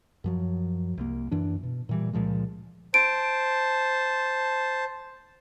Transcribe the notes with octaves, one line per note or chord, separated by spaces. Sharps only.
F#2 F3 F#3
C2 A#3
F#2 E3 D4
B2
A#2 E3 G3
C#2 A#2 F3 G#3
C5 A5 D7